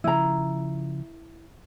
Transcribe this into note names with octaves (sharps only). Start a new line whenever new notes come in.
C#3 F3 E4 A#5